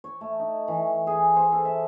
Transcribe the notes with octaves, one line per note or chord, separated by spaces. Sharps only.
C#5
A3
D#4
E3
G#4
C5
A4
E5